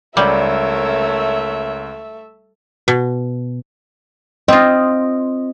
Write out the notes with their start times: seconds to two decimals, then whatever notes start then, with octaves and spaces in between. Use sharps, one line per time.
0.17 C#2 G3 A3 A#4 C#5 E5
2.88 B2
4.48 C4 F4 D#5